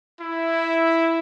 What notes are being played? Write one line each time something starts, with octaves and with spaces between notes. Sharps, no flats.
E4